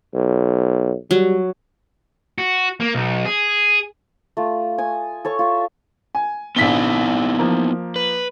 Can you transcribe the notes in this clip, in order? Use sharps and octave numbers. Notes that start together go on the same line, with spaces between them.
B1
F#3 G3
F#4
A#3
B1
G#4
A3 F4
G#5 D#6
A4 C#5 C#6
F4 E5
G#5
A#1 B3 D#4 E4 B6 G7
F3 A#3
B4